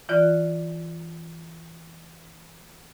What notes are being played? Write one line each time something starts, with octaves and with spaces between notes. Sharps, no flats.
E3 F4 D5 F#6